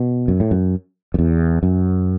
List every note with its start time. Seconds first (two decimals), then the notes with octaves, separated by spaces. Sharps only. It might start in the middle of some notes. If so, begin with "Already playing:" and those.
Already playing: B2
0.28 F#2
0.40 A2
0.51 F#2
1.14 F#2
1.19 E2
1.63 F#2